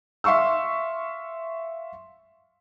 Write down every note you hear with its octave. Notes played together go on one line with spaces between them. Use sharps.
E5 F5 C6 C#6 E6